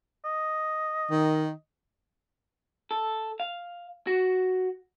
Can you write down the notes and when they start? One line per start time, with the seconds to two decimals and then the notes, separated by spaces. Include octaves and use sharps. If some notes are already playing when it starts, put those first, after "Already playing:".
0.25 D#5
1.10 D#3
2.91 A4
3.40 F5
4.07 F#4